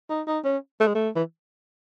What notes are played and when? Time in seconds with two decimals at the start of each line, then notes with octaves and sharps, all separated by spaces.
0.10 D#4
0.27 D#4
0.44 C#4
0.80 A3
0.87 G#3
0.95 A3
1.15 E3